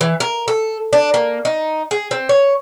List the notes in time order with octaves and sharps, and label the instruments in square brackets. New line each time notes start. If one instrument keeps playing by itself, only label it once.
[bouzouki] E3
A#4
A4
D4
A#3
D#4
G#4
C4
C#5